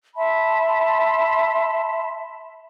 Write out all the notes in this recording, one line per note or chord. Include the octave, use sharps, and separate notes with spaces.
E5 A5 B5 C6